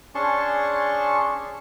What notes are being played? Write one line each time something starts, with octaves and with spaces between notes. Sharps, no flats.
C#4 D4 G#4 A5 C6 C#6